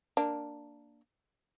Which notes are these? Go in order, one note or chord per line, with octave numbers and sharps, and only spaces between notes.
A#3 D4